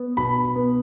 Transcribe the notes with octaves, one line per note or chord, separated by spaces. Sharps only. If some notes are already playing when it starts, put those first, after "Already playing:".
Already playing: B3
B2 B5
B3